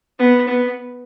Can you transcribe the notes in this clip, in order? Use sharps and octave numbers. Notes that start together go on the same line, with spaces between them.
B3
B3